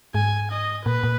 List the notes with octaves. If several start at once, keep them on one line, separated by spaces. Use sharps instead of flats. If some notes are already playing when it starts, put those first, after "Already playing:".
G#2 G#5
D#5
A#2 B4
A#2